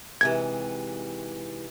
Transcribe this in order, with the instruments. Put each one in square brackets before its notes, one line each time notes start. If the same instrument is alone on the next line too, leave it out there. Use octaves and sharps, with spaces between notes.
[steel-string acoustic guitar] G#2 C3 E3 [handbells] G#6